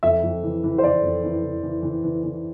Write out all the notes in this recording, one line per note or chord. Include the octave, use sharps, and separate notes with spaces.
F2 E5
F2
E3
E3
C5
E3 D5
F2
E3
E3
E3
E3
E3
E3